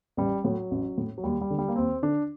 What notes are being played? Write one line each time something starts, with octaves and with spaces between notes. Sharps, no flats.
A1 G3
A2 F#3
A1
A2
F#3
D#2 G3
G3
D3
G3
A#3
D#2 C4
D3 D4